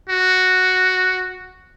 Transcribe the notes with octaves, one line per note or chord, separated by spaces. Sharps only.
F#4